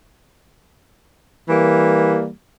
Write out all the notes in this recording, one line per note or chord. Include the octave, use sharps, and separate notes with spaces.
E3 G3 A#3